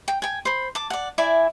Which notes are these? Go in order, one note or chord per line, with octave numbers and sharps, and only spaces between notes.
G5
G5 G#5
C5 B5
A5 D6
D5 F#5
E4 D5 E5 G#5